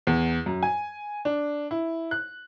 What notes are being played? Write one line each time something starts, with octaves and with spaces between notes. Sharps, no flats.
E2
F#2
G#5
D4
E4
F#6